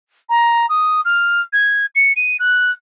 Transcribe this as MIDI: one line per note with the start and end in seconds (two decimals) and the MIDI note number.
0.29 0.66 82
0.69 1.01 87
1.05 1.41 89
1.53 1.86 92
1.95 2.13 97
2.16 2.37 99
2.39 2.72 90